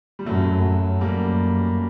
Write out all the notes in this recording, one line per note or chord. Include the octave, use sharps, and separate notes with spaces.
G3
F#2 F#3 A3
F#2 G3 A#3